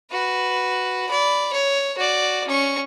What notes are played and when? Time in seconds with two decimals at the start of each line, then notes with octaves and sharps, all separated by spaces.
0.12 F#4 B4
1.09 D5 B5
1.53 C#5
1.97 F#4 D5
2.47 C#4 C#6